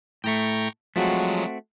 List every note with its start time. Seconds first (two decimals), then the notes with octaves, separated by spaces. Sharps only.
0.24 A2 A3 G5 A#5 C#6
0.96 F3 F#3 G#3 A3 C4 F#4